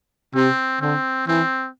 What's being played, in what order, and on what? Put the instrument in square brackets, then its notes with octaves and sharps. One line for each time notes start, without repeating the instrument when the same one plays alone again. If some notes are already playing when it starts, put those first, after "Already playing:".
[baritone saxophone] C3 [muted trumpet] C4
[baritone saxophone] D3 [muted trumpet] C4
[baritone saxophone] E3 [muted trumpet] C4